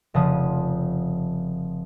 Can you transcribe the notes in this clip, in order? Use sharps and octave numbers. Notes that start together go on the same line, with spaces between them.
F1 C#3 F3 D#6